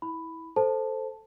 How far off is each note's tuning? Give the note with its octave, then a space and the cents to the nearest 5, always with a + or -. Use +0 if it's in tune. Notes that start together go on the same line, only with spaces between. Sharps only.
E4 -25 B5 +5
A4 +0 C5 +0 A5 +0